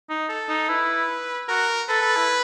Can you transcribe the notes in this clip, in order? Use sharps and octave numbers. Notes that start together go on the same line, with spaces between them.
D#4
A4
D#4
E4 B4
F#4 A#4
A4 B4
A4
E4